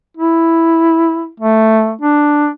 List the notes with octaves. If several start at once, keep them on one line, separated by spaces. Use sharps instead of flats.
E4
A3
D4